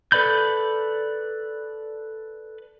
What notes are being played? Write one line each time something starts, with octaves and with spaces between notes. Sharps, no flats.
A4 B4 D5 B5 G6